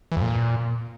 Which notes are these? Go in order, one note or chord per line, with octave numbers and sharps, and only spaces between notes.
E3
F2
A#2